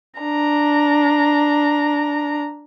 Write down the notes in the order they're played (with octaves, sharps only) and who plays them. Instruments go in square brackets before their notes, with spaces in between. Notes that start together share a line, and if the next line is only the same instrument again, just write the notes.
[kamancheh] D4 A#5